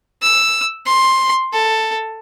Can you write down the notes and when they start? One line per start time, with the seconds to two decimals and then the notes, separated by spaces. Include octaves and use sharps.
0.22 E6
0.86 C6
1.53 A4